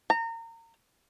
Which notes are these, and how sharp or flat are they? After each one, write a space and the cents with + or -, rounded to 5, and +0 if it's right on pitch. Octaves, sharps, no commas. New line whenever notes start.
A#5 -30